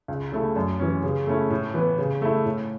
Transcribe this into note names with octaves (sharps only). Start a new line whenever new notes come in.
C#2
C#3 A3 E4
F#2
E3 C#4
C#3
A3 C#4 E4
A2
E3 B3
C#3
A3 E4
A2